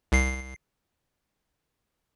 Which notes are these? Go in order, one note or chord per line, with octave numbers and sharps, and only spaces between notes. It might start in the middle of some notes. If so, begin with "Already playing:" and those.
C2 C7